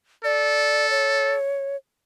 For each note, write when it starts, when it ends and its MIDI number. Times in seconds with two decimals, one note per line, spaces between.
0.24 1.36 69
0.24 0.89 74
0.91 1.76 73